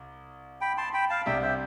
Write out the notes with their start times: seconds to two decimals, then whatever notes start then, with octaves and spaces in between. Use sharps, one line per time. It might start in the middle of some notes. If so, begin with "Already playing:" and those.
Already playing: C2
0.61 G5 B5
0.77 A5 C6
0.94 G5 B5
1.09 F5 A5
1.26 C2 C3 G3 D4 G4 E5 G5
1.42 C5 E5